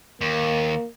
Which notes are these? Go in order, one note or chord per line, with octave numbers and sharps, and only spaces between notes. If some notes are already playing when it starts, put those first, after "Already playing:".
D#2 A#3